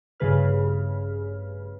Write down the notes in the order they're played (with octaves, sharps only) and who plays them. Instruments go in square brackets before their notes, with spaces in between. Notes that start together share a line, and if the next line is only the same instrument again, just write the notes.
[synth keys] A1 G2 C#3 G#4 B4 F6